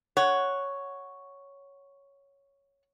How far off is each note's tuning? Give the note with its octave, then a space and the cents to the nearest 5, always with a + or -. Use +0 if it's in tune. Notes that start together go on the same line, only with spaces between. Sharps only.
C#5 +0 F#5 +0